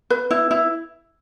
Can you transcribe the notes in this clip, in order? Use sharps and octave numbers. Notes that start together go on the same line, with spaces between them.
B4
E4
E4